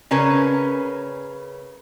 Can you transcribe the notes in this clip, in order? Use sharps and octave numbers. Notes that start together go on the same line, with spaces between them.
C#3 C#4 A#4 B4